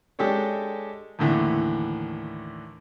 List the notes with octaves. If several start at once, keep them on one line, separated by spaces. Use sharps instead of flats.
G#3 D4 G4 A4 C#5
D#2 A2 D3 E3